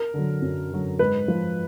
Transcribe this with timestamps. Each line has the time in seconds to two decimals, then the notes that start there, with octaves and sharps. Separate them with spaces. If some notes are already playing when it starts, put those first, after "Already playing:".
Already playing: A#4
0.14 D3 F#3
0.42 F#2
0.71 D3 F#3
0.99 G#2 B4
1.28 F3